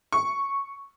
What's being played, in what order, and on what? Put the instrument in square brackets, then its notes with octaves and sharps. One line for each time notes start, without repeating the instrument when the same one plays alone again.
[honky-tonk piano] C#6